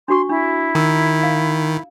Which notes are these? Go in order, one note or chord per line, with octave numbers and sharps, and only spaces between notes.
D4 F#4 C6 C#6
D4 E4
D#3 A#5 E6
F5